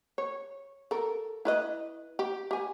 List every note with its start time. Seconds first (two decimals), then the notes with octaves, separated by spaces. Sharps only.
0.18 C#5
0.91 A4 A#4
1.45 E4 B4 D#5
2.19 G4
2.51 G4 G#5